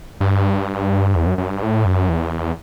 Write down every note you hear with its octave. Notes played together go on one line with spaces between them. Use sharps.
G2
E2
F#2
F#2
G2
A2
F#2
E2